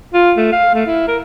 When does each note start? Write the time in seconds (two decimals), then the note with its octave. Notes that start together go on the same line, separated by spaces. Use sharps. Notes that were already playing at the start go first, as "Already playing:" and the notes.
0.14 F4
0.37 A3
0.52 F5
0.74 A3
0.87 E4
1.08 A#4